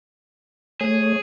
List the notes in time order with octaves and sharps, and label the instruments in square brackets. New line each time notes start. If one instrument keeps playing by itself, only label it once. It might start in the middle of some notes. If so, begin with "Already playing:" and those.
[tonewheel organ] A3 C#5 [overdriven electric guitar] G#4